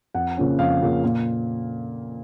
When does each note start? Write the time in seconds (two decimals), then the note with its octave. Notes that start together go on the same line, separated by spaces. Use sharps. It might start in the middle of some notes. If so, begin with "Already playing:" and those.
0.14 F2 F#5
0.37 C#3 F3 A#3 C#4
0.58 F2 F5
0.81 C#3 F3 A#3 C#4
1.03 A#2